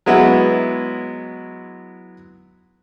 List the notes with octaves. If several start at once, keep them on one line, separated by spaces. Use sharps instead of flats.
F#3 G#3 B3 E4 F#4